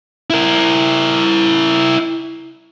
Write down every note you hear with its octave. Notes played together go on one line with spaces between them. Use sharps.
E4 A#4